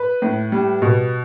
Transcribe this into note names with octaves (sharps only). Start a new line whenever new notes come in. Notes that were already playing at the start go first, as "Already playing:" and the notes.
Already playing: B4
A2
G3
B2